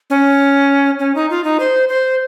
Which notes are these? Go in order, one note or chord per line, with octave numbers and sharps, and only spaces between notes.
C#4
C#4
D#4
F4
D#4
C5
C5